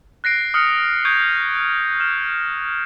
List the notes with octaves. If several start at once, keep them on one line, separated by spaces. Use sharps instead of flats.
F#6 A#6 C7 D7
D#6 F6 F#6 C#7
C#6 D#6 G6 G#6 C#7 D7
F6 E7